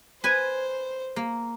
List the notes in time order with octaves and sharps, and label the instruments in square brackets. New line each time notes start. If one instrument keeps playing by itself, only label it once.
[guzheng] B4 G#5 [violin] C5
[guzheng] A#3